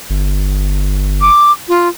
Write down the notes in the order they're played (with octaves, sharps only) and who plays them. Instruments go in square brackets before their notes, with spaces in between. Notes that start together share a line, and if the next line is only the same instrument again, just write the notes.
[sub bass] G1
[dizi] D6
F4